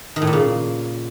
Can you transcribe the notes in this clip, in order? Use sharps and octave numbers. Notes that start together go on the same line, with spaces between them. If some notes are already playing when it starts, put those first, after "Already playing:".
D#3
A2
A#2
C#3